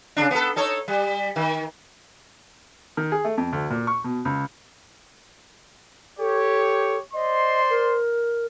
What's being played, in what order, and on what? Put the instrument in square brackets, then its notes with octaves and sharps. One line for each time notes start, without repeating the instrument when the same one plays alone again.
[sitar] C#3 F3 D4
B3 A4
D#4 A4 C#5
G3
D#3
[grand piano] D#3
G#4
A3
F2
D2
A#2
C#6
B2
C#2
[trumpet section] G4 C#5 [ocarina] A4
[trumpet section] C5 D5 C6 [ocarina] D#5
[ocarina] A#4